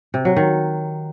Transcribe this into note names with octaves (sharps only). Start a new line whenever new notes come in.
C3
F#3
D#3